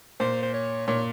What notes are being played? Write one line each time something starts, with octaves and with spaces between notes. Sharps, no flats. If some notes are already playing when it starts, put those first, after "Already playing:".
A#2 C5
C5
C#5
A#2 C#5